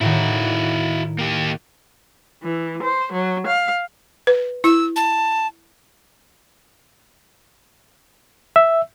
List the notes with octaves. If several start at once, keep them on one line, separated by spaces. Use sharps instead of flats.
A2 D#3 E4 F#4
A#3 G4
E3
C5
F#3
F5
B4
E4 E6
A5
E5